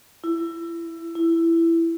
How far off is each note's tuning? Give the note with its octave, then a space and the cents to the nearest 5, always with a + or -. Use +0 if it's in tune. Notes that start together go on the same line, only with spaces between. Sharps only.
E4 +25
E4 +15